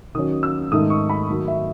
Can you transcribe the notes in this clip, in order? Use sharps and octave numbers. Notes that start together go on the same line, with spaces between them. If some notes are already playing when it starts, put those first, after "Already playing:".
D#3 F#3 C#4 D#6
E6
G#2 D#3 A3 D#4 D#6
C#6
B5
D#3 F#3 A3
E5